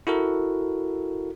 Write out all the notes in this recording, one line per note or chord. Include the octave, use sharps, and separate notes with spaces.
E4 F#4 A4 A#4